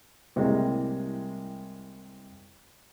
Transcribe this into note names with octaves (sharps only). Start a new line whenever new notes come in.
C2 A2 C3 G3 G#3 A#3